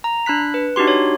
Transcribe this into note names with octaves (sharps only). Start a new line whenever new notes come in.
A#5
D4 B5 F#6 B6
B4
D4 D#4 F#4 G4 C6
C#5